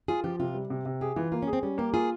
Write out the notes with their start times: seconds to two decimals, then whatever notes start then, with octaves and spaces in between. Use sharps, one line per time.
0.08 F4 G#4
0.24 F3 G4
0.40 C3 F4
0.54 G3
0.70 C3
0.86 C3
1.01 G4 G#4
1.16 E3 F4
1.32 A#3 F4
1.42 C#4 G#4
1.53 C4
1.63 G3 C#4
1.78 A#3 G4
1.94 F4 G#4